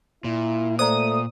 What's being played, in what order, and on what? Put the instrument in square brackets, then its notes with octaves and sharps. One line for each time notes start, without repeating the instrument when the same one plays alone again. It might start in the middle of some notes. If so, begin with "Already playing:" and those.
[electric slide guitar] A#2 [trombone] E4
[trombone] A3 [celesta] C5 D5 A#5 [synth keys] D#6